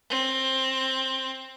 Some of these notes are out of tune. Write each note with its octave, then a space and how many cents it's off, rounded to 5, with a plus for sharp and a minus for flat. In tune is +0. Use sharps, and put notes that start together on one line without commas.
C4 +15